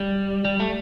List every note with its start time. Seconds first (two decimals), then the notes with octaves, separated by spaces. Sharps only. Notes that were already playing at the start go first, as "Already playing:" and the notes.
Already playing: G3
0.45 G3
0.60 A3